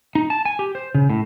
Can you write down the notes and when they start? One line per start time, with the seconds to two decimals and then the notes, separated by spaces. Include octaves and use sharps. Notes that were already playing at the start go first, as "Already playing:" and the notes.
0.15 D#4
0.30 A5
0.45 G#5
0.59 G4
0.75 C5
0.95 C#3
1.10 A2